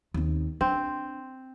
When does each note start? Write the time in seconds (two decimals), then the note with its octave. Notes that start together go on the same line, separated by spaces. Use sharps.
0.14 D#2 C4
0.61 C4 D4